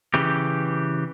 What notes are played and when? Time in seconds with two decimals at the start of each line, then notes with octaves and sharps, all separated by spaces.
0.14 C#3 E3 G4